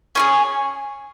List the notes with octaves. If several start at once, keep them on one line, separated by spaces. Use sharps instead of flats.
C#4 F4 G#4 C#5